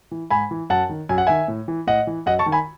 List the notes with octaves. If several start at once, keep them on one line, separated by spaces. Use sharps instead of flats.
E3
G#2 G#5 B5
E3
F#2 F#5 A5
D#3
F#2 G#5
F#5
D#3 E5 G#5
A2
E3
A2 D#5 F#5
E3
F#2 D#5 F#5
A5 C#6
D#3
G#5 B5